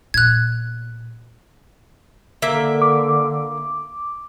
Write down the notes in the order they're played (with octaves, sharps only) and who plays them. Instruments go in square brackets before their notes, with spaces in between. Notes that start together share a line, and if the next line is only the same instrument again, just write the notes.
[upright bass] A#2 B3 [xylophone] F#6 G#6
[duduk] D3 [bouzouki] A#3 E5
[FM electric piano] D6